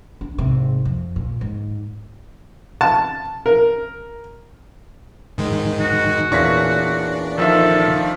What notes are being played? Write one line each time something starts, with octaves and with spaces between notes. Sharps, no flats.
D4
G#1 C3
F2
A#2
G#2
A5
A#4
G#2 D#3 G#3
F#4
E2 A#2 C#4 D4 C#6 A#6 B6
D#3 F3 A4 E5